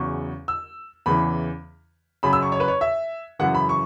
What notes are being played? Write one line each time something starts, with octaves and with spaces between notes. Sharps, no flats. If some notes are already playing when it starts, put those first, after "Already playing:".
Already playing: E2 C#3 F#3 C#6
E6
E2 C#3 E3 B5
F#2 C#3 F#3 B5
E6
C#6
C#5
B4
C#5
E5
F#2 C#3 E3 F#5
B5
C#6